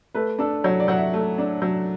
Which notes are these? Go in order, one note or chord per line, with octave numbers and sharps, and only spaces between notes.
A3 B4
D4 A4
F#3 C#5
D5
F#3 F#5
E5
A3
D4
F#3